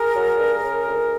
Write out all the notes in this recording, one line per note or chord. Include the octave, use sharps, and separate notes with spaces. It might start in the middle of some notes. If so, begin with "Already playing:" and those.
Already playing: G#4 A#4
F#3
G2
C#3
D2